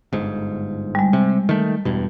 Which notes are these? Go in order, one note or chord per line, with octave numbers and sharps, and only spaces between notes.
G1 G#2
G3 G#3
C3
D#3 A3
E2 G2 B2